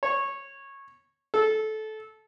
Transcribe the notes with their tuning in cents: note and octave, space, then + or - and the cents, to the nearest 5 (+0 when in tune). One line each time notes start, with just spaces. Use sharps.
C#5 -15
A4 -20